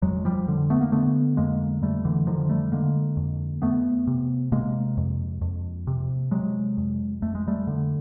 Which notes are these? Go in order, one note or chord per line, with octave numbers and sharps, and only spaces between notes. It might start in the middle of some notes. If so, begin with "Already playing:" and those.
F2 F#3 G#3
F3 G3
D3
A3 B3
A#3
D3 A3 B3
F2 G#3 A#3
F2 G3 A3
D3 E3
D3 D#3 F3
G3 A3
D3 G#3 A#3
F2
F2 A3 B3
C3
C3 G#3 A#3
F2
F2
C3
C3 F#3 G#3
F2
F2 A3
G#3
G3 A3
D3